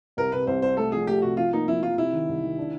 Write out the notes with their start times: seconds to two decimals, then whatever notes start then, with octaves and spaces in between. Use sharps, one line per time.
0.17 C2 A#4
0.32 C3 B4
0.47 C2 C5
0.62 C2 C5
0.77 A3 A4
0.92 F3 G#4
1.07 A3 G4
1.22 C3 F#4
1.37 F3 F4
1.53 A#3 D#4
1.68 F3 E4
1.83 F3 F4
1.97 C3 E4
2.13 D#3
2.28 C2
2.43 D#3
2.58 D4